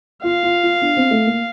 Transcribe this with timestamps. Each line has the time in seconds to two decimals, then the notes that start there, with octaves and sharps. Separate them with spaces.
0.23 F4 F5
0.43 F4
0.63 F4
0.82 D4
0.97 C4
1.11 A3
1.26 A#3